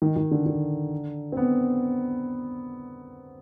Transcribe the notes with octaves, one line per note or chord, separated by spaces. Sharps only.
D#3
D#3
D3
D3
C4
B3